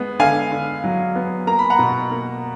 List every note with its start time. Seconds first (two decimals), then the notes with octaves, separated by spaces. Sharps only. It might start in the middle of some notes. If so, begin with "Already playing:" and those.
Already playing: G#3 B3
0.19 D3 F5 G#5
0.52 D3
0.84 F#3
1.15 B3
1.47 A#3 A#5
1.59 B5
1.70 F#5 A#5
1.79 B2
2.11 A#3